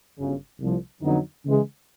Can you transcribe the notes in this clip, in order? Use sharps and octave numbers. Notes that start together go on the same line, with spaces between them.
G1 F#2 C#3
C2 A#2 F3
F2 D3 F#3 B3 D#4
C#3 E3 G#3